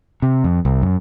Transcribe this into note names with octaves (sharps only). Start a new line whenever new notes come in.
C3
F2
C2
F#2